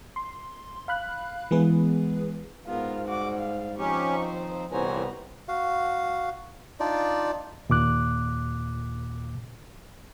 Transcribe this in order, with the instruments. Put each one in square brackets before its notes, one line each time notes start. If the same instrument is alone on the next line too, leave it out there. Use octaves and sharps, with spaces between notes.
[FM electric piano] C6
F5 B5 F#6
E3 G#3 B3 G#4 B4
[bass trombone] G#2 [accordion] B3 [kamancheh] F4 A#4
[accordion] G3 [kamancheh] F#4 D6
[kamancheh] F5
[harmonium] F3 C4 D#4 [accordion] C#4 G4 [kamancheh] C#6
[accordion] D#2 [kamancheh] C5
[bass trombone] C2 [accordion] A#2 E3 [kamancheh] B3 A#5 [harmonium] C5 C#5 G#5
[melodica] F#4 F5
D4 D#4 F4 D5
[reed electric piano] D#2 A#2 D6 F#6